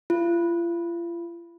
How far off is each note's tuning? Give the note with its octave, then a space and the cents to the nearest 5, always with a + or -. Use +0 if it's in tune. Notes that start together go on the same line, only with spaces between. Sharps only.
F4 -40